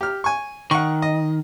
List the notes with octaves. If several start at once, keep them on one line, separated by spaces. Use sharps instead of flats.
G4 F6
G#5 C#6
D#3 F#5 C#6
D#5